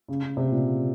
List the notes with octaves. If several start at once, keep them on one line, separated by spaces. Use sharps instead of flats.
C#3
C#3
C3
A#2